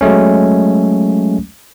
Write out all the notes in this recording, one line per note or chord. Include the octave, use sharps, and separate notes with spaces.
F#3 G#3 A3 C#4